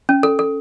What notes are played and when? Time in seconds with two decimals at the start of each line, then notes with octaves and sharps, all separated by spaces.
0.09 C#4
0.23 A4
0.39 A4